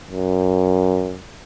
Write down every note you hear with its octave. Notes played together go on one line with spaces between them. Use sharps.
F#2